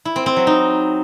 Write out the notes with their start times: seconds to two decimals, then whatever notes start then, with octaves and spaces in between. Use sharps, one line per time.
0.05 E4
0.16 C4
0.26 C4
0.36 F#3
0.47 D#4